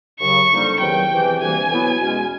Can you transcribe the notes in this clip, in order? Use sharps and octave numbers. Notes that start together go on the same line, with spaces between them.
D#2 C#3 F#3 C#6
F2 D3 G3 A#3 D#4
E2 C3 D#3 F#3 G5
E2 C3 E3
D2 C3 E3 G3 A#3 G#5
B2 F#3 B3 E4
E2 B2 G#3 C#4